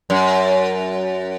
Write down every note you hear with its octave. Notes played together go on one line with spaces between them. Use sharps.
F#2